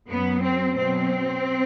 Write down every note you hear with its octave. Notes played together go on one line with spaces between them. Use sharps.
F#2 F#3 B3
C4
B2 F#3 C4